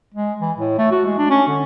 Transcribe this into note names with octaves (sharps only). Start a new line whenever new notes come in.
G#3
E3
A2
A3
F#4
G#3
D4
C#4
D3